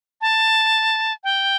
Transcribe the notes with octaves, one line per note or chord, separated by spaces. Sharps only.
A5
G5